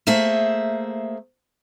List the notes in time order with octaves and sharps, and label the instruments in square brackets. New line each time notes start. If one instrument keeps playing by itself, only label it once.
[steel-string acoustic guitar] A3 A#3 G#4 C5 E5